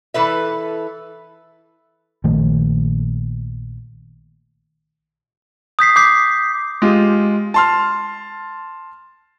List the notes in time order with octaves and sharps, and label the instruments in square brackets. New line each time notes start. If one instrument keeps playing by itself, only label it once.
[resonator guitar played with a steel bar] E3 A4 B4 E5
[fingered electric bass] A#1 D#3 A3
[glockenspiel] D#6 G6 B6 C7
D6 G6 C7
[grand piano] G#3 F4 G4
A5 C6 F6